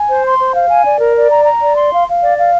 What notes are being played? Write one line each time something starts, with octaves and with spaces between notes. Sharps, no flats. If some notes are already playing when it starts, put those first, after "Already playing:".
Already playing: G#5
C5
C6
C5
F5
G#5
D5
A#4
D5
A#5
A#5
D5
C6
F5
F5
D5
F5